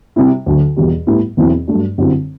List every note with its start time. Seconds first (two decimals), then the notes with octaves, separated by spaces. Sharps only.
0.16 C3 G3 C4 E4
0.46 D2 D3 F#3
0.76 E2 B2 G3
1.07 A2 G3 B3 E4
1.37 E2 B2 F#3 C4 E4
1.68 G2 F#3 A3 D4
1.98 F#2 D3 G3 C4 E4